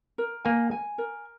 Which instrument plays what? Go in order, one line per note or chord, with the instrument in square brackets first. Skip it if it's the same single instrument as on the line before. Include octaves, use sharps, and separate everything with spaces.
[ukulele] A#4
[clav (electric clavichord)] A#3 [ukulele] G#5
[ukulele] G#5
A#4